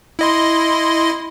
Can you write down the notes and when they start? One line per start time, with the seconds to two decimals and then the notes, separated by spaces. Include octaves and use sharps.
0.19 E4 D#5 C6